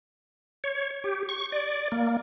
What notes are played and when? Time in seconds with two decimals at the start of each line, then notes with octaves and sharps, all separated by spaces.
0.64 C#5
1.04 G4
1.29 C#6
1.52 D5
1.92 A#3